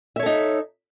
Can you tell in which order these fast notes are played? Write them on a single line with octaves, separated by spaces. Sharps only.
E5 C#5 A4 D#4